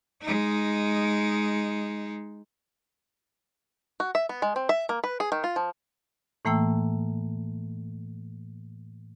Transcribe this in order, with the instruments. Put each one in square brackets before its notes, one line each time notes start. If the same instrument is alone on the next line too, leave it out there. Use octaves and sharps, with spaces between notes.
[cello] G#3 D#4
[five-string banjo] F#4
E5
B3
G#3
C4
E5
A#3
B4
G#4
D#3
F4
F3
[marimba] A2 E3 A3 A#3 G5 E6